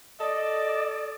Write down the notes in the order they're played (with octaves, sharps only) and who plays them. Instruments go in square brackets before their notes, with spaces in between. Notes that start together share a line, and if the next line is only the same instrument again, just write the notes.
[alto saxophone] A4 [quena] D5 [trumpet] D#5